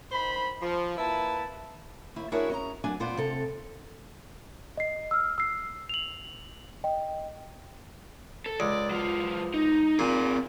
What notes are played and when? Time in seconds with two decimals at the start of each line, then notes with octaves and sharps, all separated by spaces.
0.12 D#3 C5 B5
0.62 F3
0.98 A#3 E4 B4 A5
2.16 D#2 E4
2.32 D4 E4 F#4 G#4 A#4 C#5
2.50 C#4 D#5 A#5
2.84 F#3 D4 G#5
3.00 A#2 B3 F4 C5 D5
3.17 C3 A4 A#5
4.78 D#5 C7
5.11 E6 F6
5.38 E6 C7
5.89 F7 F#7
6.84 D#5 G5
8.46 A4
8.60 C#2 D5
8.91 F#3 F4
9.54 D#4
9.99 A#2 C4 G#4